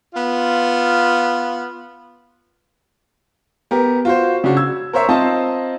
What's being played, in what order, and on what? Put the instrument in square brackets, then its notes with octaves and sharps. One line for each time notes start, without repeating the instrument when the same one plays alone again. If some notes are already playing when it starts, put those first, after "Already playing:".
[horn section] B3 F4
[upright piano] B3 G4 A#4
F4 F#4 C5
C#3 D4 F#4
E6 G#6
A#4 C5 C#5 E5
C4 D#4 F4 C5 D#5 A5